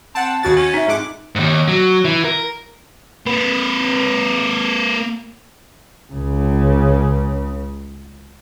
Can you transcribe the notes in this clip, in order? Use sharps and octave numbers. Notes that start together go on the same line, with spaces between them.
C4 F#5 A5
D#2 C#3 F#4 A6
C#4
D#4 E5
F2 G#2 F#5 D6
D#2 G#2
F#3
E3
A#4
A#3 B4
C#2 C#3